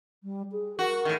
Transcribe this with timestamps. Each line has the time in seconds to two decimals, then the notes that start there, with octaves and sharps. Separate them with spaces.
0.24 G3
0.52 G#4
0.79 F#4 A#4
1.05 A2 D#3